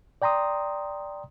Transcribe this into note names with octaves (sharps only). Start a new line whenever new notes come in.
D5 G5 A#5 C6 D#6